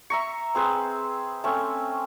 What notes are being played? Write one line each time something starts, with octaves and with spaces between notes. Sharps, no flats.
E5 A#5 C#6
C4 G#4 B4 C5
A3 C4 C#4